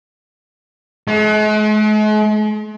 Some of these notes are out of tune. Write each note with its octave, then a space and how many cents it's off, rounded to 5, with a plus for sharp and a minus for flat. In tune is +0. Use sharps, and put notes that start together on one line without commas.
G#3 +45